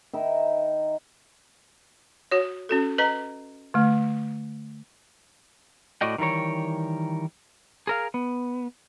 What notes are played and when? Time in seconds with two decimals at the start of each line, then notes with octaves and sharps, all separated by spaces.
0.13 D#3 D#4 E5 B5
2.31 F#4 C#5
2.69 C#4 F#4 A4
2.98 B4 D#5 A#5
3.74 D3 A3
6.01 A2 F#4 D5 D#5 G5
6.18 D#3 E3 G3 A#4 C#5
7.87 G#4 A#4 F5
8.14 B3